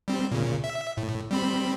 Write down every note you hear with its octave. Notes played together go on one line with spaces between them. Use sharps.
G3 C4
A#2 C#3
E5
A2
G3 C4 B5